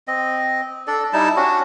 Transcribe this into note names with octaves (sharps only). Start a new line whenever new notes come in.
C4 D#5
D4 A4 D5
G3 D#4 E4 A5
C#4 D4 F#4